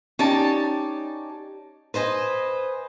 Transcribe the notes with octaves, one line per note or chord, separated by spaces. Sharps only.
C#4 D#4 G4 D5 A5
B4 C5 D#5 G#5